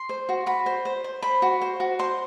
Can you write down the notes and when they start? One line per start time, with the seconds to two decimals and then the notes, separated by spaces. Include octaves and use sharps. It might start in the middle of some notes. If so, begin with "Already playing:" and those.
Already playing: C6
0.09 C5
0.29 F#4
0.46 F#4 B5
0.66 C5
0.85 C5
1.04 C5
1.22 C5 B5
1.42 F#4
1.61 C5
1.80 F#4
1.99 C5 C6